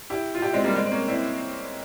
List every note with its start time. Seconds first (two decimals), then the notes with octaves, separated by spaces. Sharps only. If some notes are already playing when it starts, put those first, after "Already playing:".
0.10 E4 G4
0.35 F4
0.42 E4 G4
0.53 G#3 C4
0.64 G3 A#3
0.75 G#3 C4
0.86 C4
0.92 A#3 C#4
1.08 C4 E4